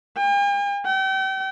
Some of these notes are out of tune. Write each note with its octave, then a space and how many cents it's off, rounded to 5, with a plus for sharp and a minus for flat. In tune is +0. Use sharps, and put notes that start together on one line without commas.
G5 +45
G5 -35